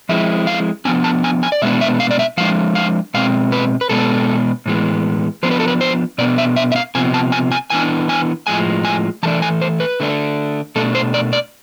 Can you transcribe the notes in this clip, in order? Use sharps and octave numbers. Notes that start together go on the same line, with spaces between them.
F3 G#3 C4 E4 E5
F5
F3 B3 D4 G#5
A5
G#5
G#5
D5
B2 G#3 B3 D4 E5
E5
F5
D5
E5
F3 G#3 D4 F5
F5
B2 G#3 C4 F5
B4
B4
B2 G#3 B3 D4 A4
A2 E3 G#3 B3
F3 B3 D4 C5
B4
A4
B4
C5
B2 B3 D4 D5
E5
E5
E5
F5
C3 F3 B3 G#5
A5
G#5
G#5
E3 B3 D4 G#5
G#5
A2 F3 G#3 G#5
G#5
E3 A3 D4 A5
G#5
C5
B4
D3 A3 D4
B2 A3 D4 A4
C5
D5
D5